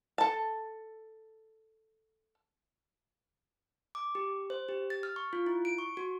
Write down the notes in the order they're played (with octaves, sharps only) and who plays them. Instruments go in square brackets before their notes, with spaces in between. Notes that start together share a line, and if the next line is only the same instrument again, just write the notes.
[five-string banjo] A4 A5
[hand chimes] D6
G4
C5
G4
A6
F6
C#6
F4
E4
D7
C#6
F#4